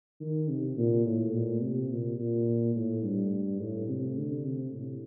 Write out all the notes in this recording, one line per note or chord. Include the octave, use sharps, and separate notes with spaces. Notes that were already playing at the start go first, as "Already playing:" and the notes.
D#3
C3
A#2
A2
A#2
C3
A#2
A#2
A2
G2
A2
C3
D3
C3
A2